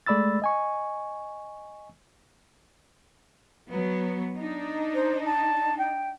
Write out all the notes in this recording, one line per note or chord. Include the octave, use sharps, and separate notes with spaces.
G#3 A3 D5 B5 E6 A6
D#5 G#5 C#6
F#3 B3
D4 D#4
C5
A5
G5